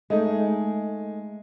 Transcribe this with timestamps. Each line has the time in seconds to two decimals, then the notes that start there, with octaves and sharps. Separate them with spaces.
0.10 G#3 A3 D#4